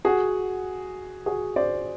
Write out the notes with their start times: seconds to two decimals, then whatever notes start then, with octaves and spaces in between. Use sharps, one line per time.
0.05 F#4 G#4
1.26 F#4 G#4
1.56 C5 D5